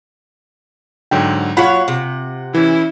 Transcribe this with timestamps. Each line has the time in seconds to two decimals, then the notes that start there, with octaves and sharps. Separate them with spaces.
1.11 G#2 D3 F#3 G5
1.57 F#3 F4 C#5 F#5 B5
1.88 C3
2.54 E3 C#4 E4